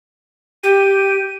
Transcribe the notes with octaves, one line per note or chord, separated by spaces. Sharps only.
G4 D#7